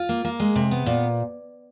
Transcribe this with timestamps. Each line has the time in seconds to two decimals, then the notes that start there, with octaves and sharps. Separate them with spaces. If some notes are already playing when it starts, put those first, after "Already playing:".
Already playing: F4
0.09 A#3
0.24 A#3
0.40 G#3
0.55 C3
0.71 B3
0.86 A#2